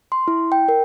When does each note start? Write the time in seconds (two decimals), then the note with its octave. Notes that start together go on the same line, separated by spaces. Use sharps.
0.12 C6
0.28 E4
0.52 G5
0.68 A#4